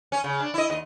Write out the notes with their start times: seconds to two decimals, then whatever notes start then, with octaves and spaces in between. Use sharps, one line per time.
0.12 C#4
0.24 C#3
0.40 D4
0.54 E4 D#5
0.70 D#2 D#5